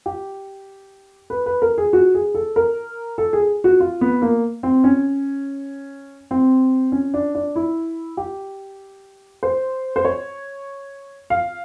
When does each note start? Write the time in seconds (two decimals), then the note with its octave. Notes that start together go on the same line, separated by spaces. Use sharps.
0.06 G4
1.30 B4
1.46 B4
1.62 A#4
1.78 G#4
1.93 F#4
2.14 G#4
2.35 A4
2.56 A#4
3.18 A4
3.33 G#4
3.64 F#4
3.80 F4
4.01 B3
4.22 A#3
4.63 C4
4.84 C#4
6.31 C4
6.92 C#4
7.14 D4
7.35 D4
7.56 E4
8.17 G4
9.43 C5
9.96 C5
10.05 C#5
11.30 F5